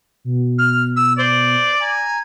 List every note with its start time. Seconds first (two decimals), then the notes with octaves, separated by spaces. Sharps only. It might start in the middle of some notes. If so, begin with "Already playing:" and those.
0.24 B2
0.59 F6
0.96 E6
1.18 C5 D5
1.80 G#5 A#5